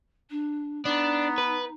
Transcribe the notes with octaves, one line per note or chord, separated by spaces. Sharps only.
D4
B3 D4 D#4
B4